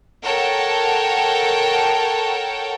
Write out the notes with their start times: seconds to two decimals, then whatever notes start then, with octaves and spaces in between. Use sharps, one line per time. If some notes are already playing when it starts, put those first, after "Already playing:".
0.22 A4 A#4 C#5 F#5 G5 A5